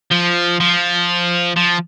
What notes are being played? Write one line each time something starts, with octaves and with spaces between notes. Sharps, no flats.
F3
F3
F3